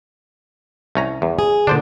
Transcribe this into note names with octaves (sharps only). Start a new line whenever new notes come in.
C2 C#4 A#5
E2
G#4
A#2 D3 D4 C5 D5